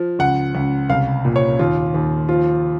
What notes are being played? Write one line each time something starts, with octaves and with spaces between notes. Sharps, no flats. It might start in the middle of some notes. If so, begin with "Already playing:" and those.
Already playing: F3
C#2 F#5
C#2
C2 F5
A#2
C#5
D#2 F4
D#2
F3 F4